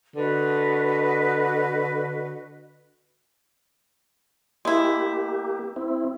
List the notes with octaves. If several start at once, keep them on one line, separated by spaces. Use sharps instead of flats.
D3 F#4 B4 D#5
G#3 A#3 E4 G4
C4 E4